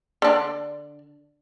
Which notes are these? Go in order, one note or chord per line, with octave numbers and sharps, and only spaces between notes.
D3 D4